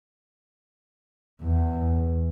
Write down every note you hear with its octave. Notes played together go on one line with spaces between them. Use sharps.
E2